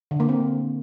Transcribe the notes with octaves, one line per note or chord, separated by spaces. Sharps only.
D3
A#3
C4